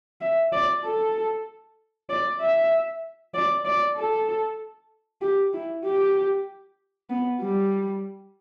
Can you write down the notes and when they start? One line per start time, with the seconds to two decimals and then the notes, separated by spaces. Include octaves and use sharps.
0.21 E5
0.52 D5
0.84 A4
2.09 D5
2.40 E5
3.34 D5
3.65 D5
3.96 A4
5.22 G4
5.53 E4
5.84 G4
7.09 B3
7.40 G3